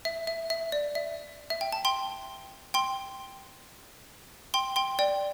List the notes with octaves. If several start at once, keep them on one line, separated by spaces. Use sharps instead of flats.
E5
E5
E5
D5
E5
E5
G5
A5
G5 C6
G5 C6
G5 C6
G5 C6
D5 G5